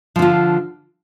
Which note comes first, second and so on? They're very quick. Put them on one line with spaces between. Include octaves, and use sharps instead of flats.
F3 D3 F4